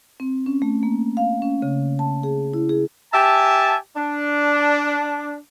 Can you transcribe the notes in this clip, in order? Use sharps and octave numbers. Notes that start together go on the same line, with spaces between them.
C4
C#4
A3
A#3
F5
C#4
C#3
A5
G#4
E4
G#4
G4 E5 G#5 A5
D4